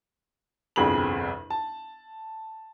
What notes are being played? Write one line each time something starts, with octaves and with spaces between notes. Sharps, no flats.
G1 C2 F2 G#4 B5 F#7
A5